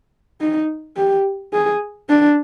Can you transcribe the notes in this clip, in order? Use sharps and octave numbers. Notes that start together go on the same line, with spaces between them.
D#4
G4
G#4
D4